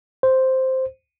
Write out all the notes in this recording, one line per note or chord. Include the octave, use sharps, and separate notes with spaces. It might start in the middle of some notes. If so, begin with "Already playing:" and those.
C5